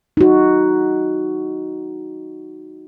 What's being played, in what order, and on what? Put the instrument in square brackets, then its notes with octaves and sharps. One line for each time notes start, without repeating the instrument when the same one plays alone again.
[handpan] D#4 F#4